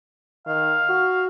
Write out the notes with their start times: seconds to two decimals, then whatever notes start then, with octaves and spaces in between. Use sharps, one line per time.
0.47 D#3 F5
0.89 F#4